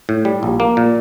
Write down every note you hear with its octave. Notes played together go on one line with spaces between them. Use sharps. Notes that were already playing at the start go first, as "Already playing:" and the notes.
A2
G3
A#1
A#3
A#2